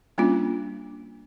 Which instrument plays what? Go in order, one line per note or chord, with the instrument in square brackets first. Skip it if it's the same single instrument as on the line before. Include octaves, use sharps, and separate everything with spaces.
[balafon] G3 A#3 C#4 D4 F4